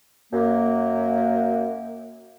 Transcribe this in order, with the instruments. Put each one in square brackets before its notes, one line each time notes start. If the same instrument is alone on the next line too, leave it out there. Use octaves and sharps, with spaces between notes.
[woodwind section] F#2 A#3